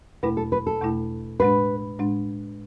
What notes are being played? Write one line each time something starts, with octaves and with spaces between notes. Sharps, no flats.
E2 B2 A3 E4 B4
A4
B4
A4
E2 B2 A3 E4
A2 G#3 D4 B4
A2 G#3 D4